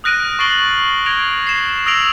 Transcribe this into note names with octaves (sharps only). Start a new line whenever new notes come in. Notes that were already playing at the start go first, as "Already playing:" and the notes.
D#6 F6 F#6 A#6 D7 D#7
C#6 A6 C7 D7 F#7 G7
G#6 A#6 D7 F7 G7
C7 E7 F#7
D#6 E6 A#6 D7 F7 F#7